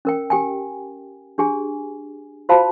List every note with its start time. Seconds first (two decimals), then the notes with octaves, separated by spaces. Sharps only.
0.05 C#4 A#4 G5
0.30 G4 G5 G#5
1.38 D4 G4 G#4 G#5
2.49 F4 F#4 C5 F5 A5 B5